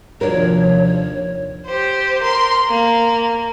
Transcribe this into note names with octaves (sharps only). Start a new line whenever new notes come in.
D#2 C3 F3 D4 F#4 A#4 C#5
G4 C5
A#4 C6
A#3